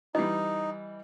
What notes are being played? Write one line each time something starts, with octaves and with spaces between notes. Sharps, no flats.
E3 G3 D#4 D#5